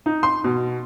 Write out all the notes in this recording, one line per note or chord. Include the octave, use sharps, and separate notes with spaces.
D#4
C6
B2